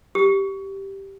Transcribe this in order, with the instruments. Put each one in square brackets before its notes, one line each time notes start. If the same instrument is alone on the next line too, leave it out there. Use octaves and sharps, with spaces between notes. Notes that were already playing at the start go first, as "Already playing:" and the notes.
[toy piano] G4